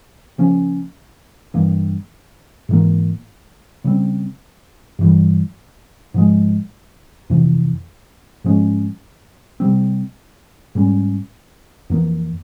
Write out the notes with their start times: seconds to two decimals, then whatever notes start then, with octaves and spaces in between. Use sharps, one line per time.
0.38 C#3 F3 A#3 C#4
1.54 G2 E3 A#3
2.69 G#2 E3 A#3
3.84 C#3 G3 C4
4.99 G2 E3 G3
6.14 G#2 F3 G#3
7.30 F2 C3 E3
8.44 G#2 F3 G#3 C#4
9.60 C3 G3 C4
10.75 G#2 G3 C#4
11.90 F2 E3 A#3